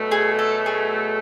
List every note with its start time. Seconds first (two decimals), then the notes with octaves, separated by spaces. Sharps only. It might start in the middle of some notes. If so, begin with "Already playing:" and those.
Already playing: B2 F#3 A3
0.11 G#4
0.39 A4
0.66 G#4